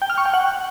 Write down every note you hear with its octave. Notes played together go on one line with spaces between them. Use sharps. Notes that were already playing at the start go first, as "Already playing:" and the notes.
G5
F6
C#6
G5
F#5